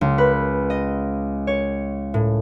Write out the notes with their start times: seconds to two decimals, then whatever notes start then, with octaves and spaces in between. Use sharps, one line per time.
0.01 C#2
0.18 B4
0.70 D#5
1.47 C#5
2.14 A2